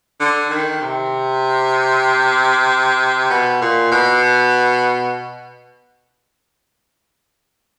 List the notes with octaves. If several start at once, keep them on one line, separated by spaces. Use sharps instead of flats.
D3
D#3
C3
B2
A#2
B2